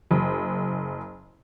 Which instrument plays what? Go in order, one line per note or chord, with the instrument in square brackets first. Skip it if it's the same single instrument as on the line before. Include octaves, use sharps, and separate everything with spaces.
[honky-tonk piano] F#1